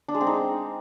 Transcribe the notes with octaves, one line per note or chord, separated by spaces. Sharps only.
D4
G#3
C4
D#4